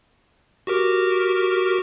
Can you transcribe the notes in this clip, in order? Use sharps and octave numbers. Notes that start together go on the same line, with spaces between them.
F#4 G4 A#4